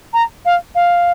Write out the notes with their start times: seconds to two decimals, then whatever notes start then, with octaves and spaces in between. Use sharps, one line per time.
0.14 A#5
0.45 F5
0.75 F5